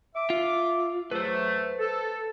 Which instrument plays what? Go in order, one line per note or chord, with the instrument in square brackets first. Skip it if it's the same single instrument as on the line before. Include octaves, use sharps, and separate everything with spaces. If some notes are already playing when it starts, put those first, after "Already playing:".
[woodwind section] E5 D6
[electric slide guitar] F4
[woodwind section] E2 F#3 A3 [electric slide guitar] B4 C5
[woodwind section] A4